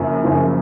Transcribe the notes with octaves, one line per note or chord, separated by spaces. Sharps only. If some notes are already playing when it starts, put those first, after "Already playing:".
Already playing: F#1 F#2 C#3 F3
F#1 F#2 C#3 F3